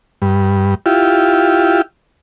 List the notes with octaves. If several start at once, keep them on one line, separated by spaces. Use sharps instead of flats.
G2
E4 F4 G4